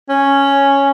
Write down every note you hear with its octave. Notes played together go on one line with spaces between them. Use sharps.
C#4